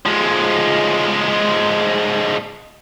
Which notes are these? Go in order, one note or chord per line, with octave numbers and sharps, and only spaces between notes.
F3 G#3